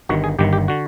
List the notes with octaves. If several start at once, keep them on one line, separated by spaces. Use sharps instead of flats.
G1 G2 D#3 F#4
G#4
G1 G2 D#3 G4
G4
D3 F#4